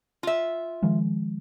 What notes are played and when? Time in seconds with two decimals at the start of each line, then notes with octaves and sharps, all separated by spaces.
0.23 F4 E5
0.83 D#3 F3 G#3